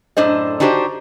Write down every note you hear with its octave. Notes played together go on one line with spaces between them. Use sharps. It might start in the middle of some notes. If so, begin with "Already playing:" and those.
F#2 A2 D4 C5 D#5
D4 D#4 F#4 G4 A#4 C5